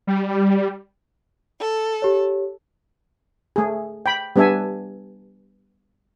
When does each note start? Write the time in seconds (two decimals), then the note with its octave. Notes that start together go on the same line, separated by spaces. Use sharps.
0.07 G3
1.58 A4
2.02 G4 C#5
3.56 A3 G#4
4.06 G5 B5
4.36 G3 B3 D4 A4 E5 G#5